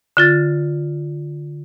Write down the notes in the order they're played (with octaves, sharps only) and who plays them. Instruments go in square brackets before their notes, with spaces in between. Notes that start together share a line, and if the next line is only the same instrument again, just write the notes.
[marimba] D3 F4 A6